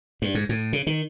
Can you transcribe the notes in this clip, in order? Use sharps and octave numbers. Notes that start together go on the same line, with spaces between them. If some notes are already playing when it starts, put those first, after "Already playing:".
G2
G#2
A2
C#3
D#3